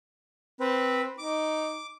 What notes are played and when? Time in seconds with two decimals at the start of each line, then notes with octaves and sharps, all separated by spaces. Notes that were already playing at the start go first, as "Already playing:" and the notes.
0.60 C4 B4
1.18 D#4 D6